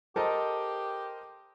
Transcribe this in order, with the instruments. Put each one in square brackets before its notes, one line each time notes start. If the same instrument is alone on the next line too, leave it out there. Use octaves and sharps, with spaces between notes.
[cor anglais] G4 [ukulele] A4 [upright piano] A#4 C5 D#5